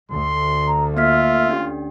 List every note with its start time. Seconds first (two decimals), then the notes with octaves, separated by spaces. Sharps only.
0.12 D2 C6
0.68 A#5
0.97 A#3 F4 E5 F6 B6
1.49 C#4 D4 G4